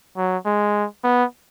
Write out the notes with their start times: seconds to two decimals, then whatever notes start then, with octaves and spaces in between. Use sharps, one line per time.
0.17 F#3
0.45 G#3
1.04 B3